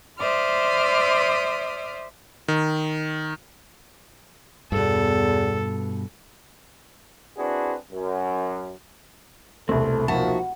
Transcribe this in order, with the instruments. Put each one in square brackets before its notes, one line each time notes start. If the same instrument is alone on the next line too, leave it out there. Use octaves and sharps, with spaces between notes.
[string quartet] C5 D5 E5 C6 D#6 F6
[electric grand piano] D#3
[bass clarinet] E2 [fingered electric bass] G2 B2 [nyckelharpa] A4
[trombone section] C4 D4 E4 F#4 G#4 B4
F#2
[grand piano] E1 C2 [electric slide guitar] A3 C4 [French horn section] A4
[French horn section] F3 A#3 [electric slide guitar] D#4 E5 A5 [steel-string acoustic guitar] F#4